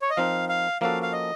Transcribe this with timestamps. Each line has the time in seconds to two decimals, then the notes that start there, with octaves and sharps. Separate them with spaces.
0.02 C#5
0.10 D#5
0.17 F3 C4 D#4 A#4 F5
0.49 F5
0.81 F3 A#3 C#4 F#4 A4 F5
1.03 F5
1.12 D#5